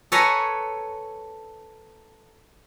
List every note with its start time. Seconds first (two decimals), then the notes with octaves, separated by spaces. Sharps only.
0.12 A4 B4 C#5 G#5 A#5